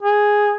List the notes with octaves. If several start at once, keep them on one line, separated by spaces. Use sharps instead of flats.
G#4